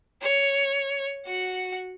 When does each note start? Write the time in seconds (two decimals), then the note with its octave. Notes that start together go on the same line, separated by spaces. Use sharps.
0.21 C#5
1.26 F#4 F#5